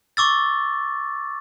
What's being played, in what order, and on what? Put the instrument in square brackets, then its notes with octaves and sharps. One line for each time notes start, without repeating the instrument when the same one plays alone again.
[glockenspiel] C#6 D6 E6 A6